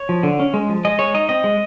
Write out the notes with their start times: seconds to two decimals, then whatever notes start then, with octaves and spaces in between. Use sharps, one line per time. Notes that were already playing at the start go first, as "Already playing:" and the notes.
Already playing: C#5
0.09 F3
0.23 D3
0.40 C#4
0.54 G#3
0.69 F3
0.85 G#3 D#5
0.99 G#3 C#5
1.14 D#4 D#5
1.29 C4 D#5
1.44 G#3